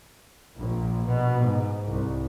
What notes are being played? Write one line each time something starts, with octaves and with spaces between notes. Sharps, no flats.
A#1
B2
G#2
C2